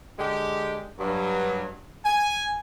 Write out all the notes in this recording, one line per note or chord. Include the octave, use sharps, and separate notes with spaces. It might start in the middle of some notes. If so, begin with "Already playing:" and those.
D3 G#3 G4
G2 F#3
G#5